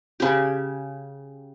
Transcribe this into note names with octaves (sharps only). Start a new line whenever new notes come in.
C#3 G4